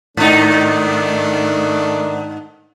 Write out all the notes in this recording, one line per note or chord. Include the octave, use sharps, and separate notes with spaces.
G#2 D#3 A3 D4 D#4